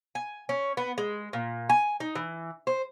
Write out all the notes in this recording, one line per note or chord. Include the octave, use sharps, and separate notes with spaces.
G#5
C#4
B3
G#3
A#2
G#5
D#4
E3
C5